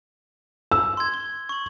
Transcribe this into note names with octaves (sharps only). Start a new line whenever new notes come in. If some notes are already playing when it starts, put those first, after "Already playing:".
E6
C6 G#6
G7
C#6 F#7